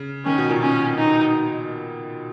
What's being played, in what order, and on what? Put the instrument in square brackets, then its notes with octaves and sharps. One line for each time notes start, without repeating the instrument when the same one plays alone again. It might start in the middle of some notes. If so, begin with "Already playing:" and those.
Already playing: [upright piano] C#3
[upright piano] D#3 [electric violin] C#4
[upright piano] B2
A#2
[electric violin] C#4
D#4